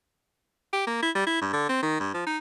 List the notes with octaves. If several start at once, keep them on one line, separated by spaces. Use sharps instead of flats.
G4
A#3
E4
G3
E4
G2
D3
C4
D#3
G2
F3
D#4